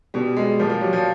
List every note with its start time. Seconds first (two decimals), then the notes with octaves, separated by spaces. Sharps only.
0.14 B2 G3
0.37 G#3
0.59 A#2 F3 G3
0.70 G3
0.81 F#3
0.93 F3